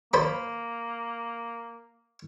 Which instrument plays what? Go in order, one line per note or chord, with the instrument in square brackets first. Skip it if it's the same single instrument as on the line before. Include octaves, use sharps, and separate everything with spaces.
[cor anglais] A#3 [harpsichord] C5 B5